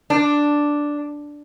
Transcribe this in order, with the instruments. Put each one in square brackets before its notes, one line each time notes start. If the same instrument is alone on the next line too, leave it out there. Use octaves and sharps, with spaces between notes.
[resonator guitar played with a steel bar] D4